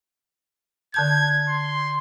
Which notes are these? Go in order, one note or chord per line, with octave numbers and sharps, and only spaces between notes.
D3 A5 G6 G#6
C6